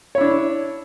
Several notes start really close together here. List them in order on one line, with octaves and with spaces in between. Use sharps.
C#5 E4 D4